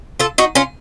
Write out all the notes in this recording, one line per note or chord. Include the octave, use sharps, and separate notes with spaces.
F4 A4
D#4 F#4
C#4 F4